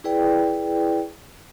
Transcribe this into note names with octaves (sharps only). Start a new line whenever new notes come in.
E4 G#4 B4 D5 G5